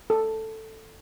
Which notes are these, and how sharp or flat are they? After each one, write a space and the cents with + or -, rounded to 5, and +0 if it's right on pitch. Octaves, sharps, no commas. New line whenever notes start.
A4 +5